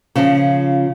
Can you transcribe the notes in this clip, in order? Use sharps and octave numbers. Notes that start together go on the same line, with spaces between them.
C#3 F3